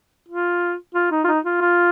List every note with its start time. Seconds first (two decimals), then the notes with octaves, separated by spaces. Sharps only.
0.29 F4
0.95 F4
1.11 D#4
1.24 F4
1.28 D#4
1.45 F4
1.61 F4